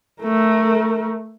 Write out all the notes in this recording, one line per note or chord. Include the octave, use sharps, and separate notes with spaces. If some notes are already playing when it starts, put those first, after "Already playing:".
A3 A#4